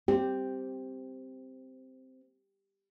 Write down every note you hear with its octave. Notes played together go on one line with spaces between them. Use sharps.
C4 G4